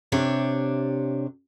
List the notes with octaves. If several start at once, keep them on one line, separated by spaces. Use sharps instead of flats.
C3 D4 G4 C#5